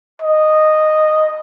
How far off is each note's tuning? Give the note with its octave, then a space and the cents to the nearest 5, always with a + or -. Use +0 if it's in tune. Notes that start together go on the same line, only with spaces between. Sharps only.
D#5 -10